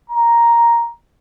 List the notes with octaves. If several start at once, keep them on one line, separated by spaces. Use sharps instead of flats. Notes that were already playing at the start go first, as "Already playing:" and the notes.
A#5